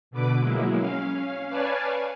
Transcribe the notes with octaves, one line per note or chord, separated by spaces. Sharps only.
B2 D3 B4 D6
F#3 G#3 A#3 E4
C#4 F5
B4 C#5 D5 F5 G#5 A5